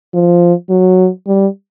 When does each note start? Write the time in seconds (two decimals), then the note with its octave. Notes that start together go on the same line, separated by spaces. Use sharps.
0.14 F3
0.70 F#3
1.27 G3